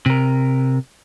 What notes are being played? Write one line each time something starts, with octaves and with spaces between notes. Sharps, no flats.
C3 A#4